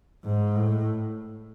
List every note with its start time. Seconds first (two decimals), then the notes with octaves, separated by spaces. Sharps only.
0.25 G#2
0.56 A2